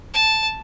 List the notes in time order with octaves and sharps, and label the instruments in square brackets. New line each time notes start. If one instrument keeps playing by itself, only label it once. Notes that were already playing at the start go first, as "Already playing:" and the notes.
[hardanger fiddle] A5